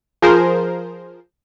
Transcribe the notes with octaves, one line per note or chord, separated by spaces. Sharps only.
F3 G#4 A#4 C5